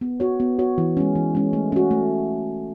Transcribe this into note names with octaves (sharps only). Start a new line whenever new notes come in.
B3
F#4 C#5
B3
F#4 C#5
E3
G#3 C#4
E3
G#3 C#4
A3
C#4 F#4
A3